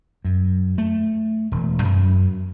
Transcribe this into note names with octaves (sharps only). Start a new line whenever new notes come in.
F#2
A3
E1
F#2